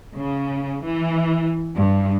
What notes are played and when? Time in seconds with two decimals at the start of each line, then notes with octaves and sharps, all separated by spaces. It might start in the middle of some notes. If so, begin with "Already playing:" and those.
0.13 C#3
0.82 E3
1.75 G2